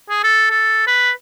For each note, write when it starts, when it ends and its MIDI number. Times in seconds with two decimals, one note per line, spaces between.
0.09 0.21 68
0.24 0.47 69
0.50 0.85 69
0.87 1.11 71